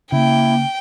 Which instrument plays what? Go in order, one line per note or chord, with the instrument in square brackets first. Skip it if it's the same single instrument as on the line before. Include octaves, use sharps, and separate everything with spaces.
[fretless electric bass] C#3 [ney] A#3 [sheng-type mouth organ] E4 [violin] G5